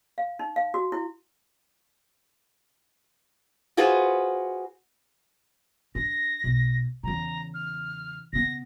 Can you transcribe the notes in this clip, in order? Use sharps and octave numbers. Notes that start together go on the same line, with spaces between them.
F5
D#4
F5
F#4
E4
F4 F#4 G#4 B4 C5
D4 A#6
B1
E2 C#3 A#5
F6
C#3 B3 A#6